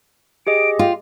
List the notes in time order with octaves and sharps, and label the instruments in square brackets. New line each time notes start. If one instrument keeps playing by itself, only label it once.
[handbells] G4 G#4 D#5 [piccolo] D7
[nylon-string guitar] F4 [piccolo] G5